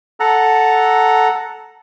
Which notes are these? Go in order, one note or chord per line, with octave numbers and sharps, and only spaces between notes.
A4 F#5 A#5